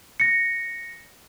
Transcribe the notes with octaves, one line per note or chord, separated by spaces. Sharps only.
A#6 C#7